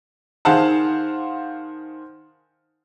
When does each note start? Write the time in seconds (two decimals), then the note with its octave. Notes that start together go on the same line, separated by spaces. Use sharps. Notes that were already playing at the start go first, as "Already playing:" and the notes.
0.45 D#3 G#4 C5 F5 F#5 A5